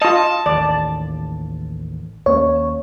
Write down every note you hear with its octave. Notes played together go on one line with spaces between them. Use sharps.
F4 D#5 A5
A1 D#2 D5
D#2 A#3 C#4 C#5